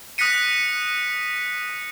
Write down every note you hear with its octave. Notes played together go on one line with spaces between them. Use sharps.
D#6 F#6 A#6 B6 C#7 D#7